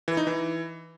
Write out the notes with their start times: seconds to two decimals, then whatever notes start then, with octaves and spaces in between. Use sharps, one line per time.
0.08 E3
0.17 D#4
0.27 E3